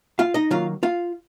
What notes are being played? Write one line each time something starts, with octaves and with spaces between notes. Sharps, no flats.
F4 F5
D#4 D#5
D#3 F#3 A#3 F4 F5
F4 F5